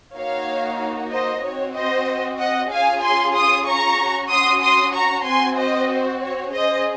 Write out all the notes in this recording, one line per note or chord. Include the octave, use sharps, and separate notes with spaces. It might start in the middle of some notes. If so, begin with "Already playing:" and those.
A#3 D#4 F#4 C#5 F5
C5 D#5
C4 F#4 C#5
C5 D#5
D#5 F#5
C#4 F4 G#4 F5 G#5
G#5 C6
C6 D#6
A#5 C#6
C#4
F#4
C6 D#6
C6 D#6
A#5 C#6
C4 F#4 G#5 C6
C5 D#5
C5
C#5
C#4 G#4 C5 D#5